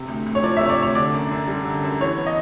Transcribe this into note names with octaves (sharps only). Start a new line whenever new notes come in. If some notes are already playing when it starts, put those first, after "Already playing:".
Already playing: C3
D2
D2
C#5
F3 D5
E5
C3 C#5
D5
D2 C#5
D3 D5
F#2
F#2
G3
D3
F#2
E3 C#5
B3
D#5